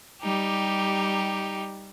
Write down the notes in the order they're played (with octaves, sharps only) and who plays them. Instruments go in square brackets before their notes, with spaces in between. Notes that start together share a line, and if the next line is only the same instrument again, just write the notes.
[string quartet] G3 D#4 G4